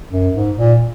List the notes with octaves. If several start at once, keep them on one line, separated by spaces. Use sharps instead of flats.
F#2
G#2
A#2